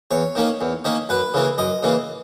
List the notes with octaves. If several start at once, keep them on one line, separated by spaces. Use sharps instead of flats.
E2 C#5
D#3 A#3 C#4
E2
D#3 A#3 C#4
F#2 B4
C#3 E3 A#3
F#2 D#5
C#3 E3 A#3